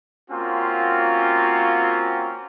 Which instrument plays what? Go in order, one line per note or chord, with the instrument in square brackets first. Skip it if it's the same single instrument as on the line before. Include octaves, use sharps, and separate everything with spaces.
[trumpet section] A#3 C4 C#4 F4 F#4